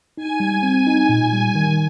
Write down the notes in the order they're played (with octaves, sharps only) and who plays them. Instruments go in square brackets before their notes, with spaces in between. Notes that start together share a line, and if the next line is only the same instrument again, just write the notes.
[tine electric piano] D#4 [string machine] G#5
[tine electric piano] G3
C4
D#4
A#2
G3
D#3